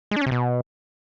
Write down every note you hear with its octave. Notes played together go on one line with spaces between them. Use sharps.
G#3
D4
C#4
C3
B2